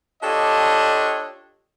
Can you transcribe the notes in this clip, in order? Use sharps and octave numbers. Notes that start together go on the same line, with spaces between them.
D4 F4 G4 A4 C#5 D#5